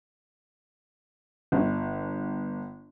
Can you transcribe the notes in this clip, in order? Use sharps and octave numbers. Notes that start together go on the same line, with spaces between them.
G1